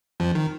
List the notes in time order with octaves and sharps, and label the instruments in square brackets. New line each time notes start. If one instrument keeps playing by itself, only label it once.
[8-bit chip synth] F2 F3
D#3